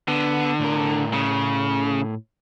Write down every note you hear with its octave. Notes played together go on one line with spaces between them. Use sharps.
D3 B3
A2 A#4
C#3